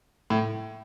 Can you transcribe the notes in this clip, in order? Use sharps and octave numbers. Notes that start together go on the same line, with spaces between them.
A2